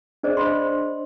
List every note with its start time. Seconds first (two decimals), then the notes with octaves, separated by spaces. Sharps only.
0.23 D4 G#4 C5 D5 D#5
0.37 C5 D#5 B5 C6